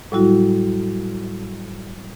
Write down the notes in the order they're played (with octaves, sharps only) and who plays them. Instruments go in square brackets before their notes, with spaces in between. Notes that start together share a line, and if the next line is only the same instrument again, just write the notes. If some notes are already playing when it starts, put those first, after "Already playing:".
[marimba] A2 F#3 G3 E4 F#4